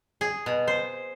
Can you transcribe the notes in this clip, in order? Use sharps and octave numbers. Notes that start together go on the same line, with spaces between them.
G#4
B2
C5